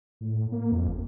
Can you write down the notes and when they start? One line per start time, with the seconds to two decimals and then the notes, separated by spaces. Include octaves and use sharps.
0.21 A2
0.52 A#3
0.72 F2
0.88 F#1